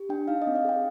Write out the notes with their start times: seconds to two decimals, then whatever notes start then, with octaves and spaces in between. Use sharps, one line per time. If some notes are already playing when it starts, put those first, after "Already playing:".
Already playing: G4
0.09 D4 G5
0.28 D#4 F5
0.42 D#5
0.47 C4
0.55 F5
0.65 G#4 G5